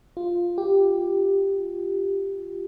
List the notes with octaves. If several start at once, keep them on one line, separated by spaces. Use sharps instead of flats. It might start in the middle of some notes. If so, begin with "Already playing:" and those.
F4
G4